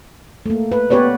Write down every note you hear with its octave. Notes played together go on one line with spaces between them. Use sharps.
A3 A#3
B4
B3 G4 B4 C#5 D5